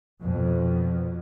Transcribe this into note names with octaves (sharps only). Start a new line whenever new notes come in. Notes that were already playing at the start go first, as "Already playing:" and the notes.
F2 B2